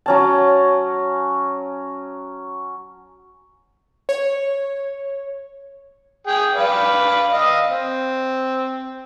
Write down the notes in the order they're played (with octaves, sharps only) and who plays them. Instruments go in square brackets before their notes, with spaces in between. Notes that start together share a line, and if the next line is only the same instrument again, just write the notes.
[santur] F#3 C#4 A5
[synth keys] C#5
[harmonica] G#4 G5
B4 D5 F5
D#5 F5
C4